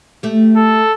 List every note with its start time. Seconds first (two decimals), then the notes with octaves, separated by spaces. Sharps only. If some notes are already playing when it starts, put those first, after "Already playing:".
0.23 A3 G4
0.56 A4